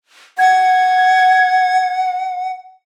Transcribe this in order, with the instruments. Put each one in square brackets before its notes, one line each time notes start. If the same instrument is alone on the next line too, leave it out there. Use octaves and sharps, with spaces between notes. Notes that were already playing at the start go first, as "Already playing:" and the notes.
[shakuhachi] F#5 [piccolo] G#6